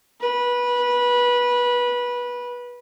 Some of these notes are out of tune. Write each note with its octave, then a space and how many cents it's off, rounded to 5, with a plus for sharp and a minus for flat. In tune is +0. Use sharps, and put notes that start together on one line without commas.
B4 -20